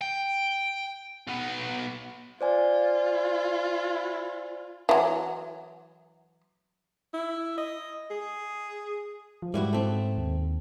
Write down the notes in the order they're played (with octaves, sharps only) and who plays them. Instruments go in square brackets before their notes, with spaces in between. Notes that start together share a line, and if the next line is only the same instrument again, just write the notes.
[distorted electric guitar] G5
B1 B3
[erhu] F4 [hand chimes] C5 D5 G#5
[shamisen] E3 F#3
[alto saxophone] E4
D#5
G#4
[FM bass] F3
[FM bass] G#2 [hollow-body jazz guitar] G3 E4 F#4
[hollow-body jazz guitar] A3 C4
[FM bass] D#2